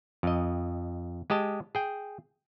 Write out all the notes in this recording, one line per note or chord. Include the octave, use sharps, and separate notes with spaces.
F2 D#5
G#3 G4 D#5 A5
G#4 G5